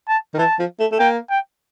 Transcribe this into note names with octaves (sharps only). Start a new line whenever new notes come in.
A5
D#3
E3 A5
F3
A3
A3
A#3 G5
G5